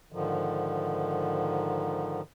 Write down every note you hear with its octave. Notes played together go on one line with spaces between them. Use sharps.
G#2 D3 D#3 F3